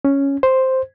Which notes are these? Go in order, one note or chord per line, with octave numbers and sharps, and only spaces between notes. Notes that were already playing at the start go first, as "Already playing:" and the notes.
C#4
C5